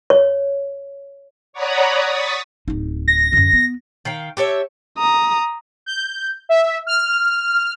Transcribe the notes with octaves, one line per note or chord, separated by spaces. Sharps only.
C#5
C#5 D5 F#5 A#5 B5 D#6
C#6 D#6 A6 B6
D1 D#4
A#6
F#2 D3
B3
D#3 F5 G5
G4 A4 C#5 E5
A#5 D#6
G6
E5
F6